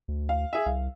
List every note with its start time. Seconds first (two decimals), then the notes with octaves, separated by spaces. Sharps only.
0.08 D2
0.29 F5
0.53 G#4 E5
0.66 C2 F5